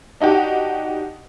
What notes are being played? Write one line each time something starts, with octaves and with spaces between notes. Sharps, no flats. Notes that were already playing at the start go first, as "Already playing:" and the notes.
D4 D#4 F#4 G4